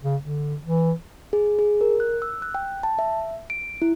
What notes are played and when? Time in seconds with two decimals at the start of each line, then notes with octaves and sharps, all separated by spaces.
0.04 C#3
0.21 D3
0.63 E3
1.33 G#4
1.59 G#4
1.81 A#4
2.00 F#6
2.22 E6
2.42 F#6
2.55 G5
2.83 A5
2.99 E5
3.50 D7
3.82 E4